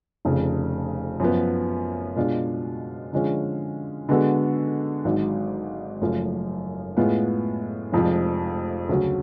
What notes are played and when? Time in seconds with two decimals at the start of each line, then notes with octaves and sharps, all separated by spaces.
0.25 F1 F2 C#3
1.20 F#2 F3 B3
2.16 B2 G#3 D4 F4
3.13 D3 F3 G#3 C#4 F4
4.09 D3 G#3 B3 F#4 A4
5.05 G#1 G#2 F#3
6.01 F#1 F#2 F3 A3 F4
6.97 A2 G#3 B3 F4
7.92 F1 F2 F3 G#3
8.89 D2 C#3 F#3 C#4 F#4